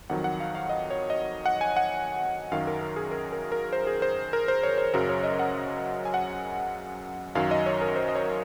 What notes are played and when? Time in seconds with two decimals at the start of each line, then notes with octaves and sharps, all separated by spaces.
0.10 F2 D#3 F#3 F#5
0.24 F#5
0.40 F5
0.55 F5
0.69 D#5
0.90 C#5
1.10 D#5
1.46 F#5
1.61 G#5
1.76 F#5
2.52 F#2 D#3 F#3 F5
2.67 A#4
2.82 A#4
2.96 G#4
3.11 A#4
3.32 A#4
3.52 A#4
3.73 C5
3.87 G#4
4.02 C5
4.33 A#4
4.48 C5
4.63 C#5
4.78 C5
4.94 F#2 C#3 F#3 A#4
5.09 C#5
5.23 D#5
5.39 F#5
6.05 G#5
6.14 F#5
7.35 F#2 D#3 F#3 F5
7.51 D#5
7.66 C#5
7.81 A#4
7.96 C5
8.09 D#5
8.15 C#5